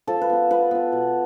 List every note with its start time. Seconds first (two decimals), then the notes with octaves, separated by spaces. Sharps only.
0.07 F3 A4
0.21 B4
0.30 B3 F4
0.50 F3 B4
0.71 B3 F4
0.92 B2